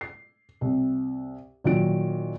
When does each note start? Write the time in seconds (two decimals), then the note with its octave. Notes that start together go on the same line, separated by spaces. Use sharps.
0.01 C7
0.61 C2
1.64 A#2 D#3 F#3 D7